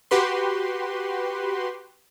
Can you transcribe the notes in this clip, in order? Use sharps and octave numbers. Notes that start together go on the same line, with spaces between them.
F#4 G4 B4 C6